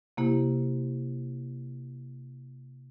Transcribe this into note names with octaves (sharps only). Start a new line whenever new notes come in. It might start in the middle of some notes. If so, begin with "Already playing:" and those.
C3 A#3 E4 G4